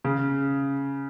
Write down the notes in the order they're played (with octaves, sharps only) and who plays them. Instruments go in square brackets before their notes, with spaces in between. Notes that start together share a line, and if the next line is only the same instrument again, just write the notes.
[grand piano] C#3